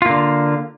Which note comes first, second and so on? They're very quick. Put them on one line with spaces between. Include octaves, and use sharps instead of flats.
F4 A#3 D3